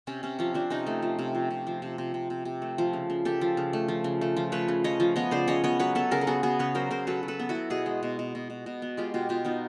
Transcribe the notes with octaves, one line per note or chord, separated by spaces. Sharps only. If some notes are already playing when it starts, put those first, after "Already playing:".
C3 C#4
C3 C#4
F3 C#4
F3 C4 D4
C3 C#4 D#4
A3
F3
C3
F3
C3
F3
C3
C3
C3
C3
C3
A3
F3
C#3
C#3
C#3 G4 A4
F3
C#3
A3
F3
C#3
A3
F3
A3 B4 C#5
C#3
F3 C#5 D#5
F3
B3 C#5 D#5
C#3 C5 D5
C#3 C#5 D#5
B3 C#5 D#5
F#3 B4 C#5
B3 A4 B4
C#3 G#4 A#4
A4
B3 F#4 G#4
B3 F#4 G#4
C#3 B4 C#5
F#3 A#4 C5
C#3 A#4 C5
F#3 A4 B4
F#3
A4 B4
B3
E4 F#4
B3
B2 F#4 G#4
G#3
B2
B2
B2
B2
B2
B3
G#3 F4 G4
B2 F4 G4
B2 F4 G4
B3 D#4 F4